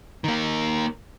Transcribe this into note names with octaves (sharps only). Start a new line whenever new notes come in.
D#3 A#3